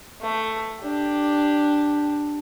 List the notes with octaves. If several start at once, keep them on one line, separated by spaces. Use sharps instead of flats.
A3
D4 G4